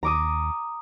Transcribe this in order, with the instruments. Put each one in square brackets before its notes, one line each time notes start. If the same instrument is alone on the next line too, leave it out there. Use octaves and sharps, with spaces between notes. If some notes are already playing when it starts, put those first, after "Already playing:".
[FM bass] D#2 [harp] A#5 D6 D#6